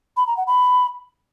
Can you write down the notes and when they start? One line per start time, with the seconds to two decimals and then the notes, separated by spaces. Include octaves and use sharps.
0.17 B5
0.27 A#5
0.37 F#5
0.47 B5